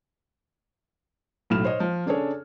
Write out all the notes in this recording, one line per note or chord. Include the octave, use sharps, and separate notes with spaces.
B1 A2 F#3 B5 F6 E7
C5 C#5 D#5
F3
C#3 D4 G#4 A4 C#5